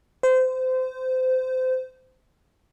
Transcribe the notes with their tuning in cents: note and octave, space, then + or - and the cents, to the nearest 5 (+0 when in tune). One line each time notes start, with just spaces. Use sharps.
C5 -25